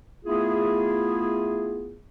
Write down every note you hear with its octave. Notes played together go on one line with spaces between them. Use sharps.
A3 B3 E4 F4 G#4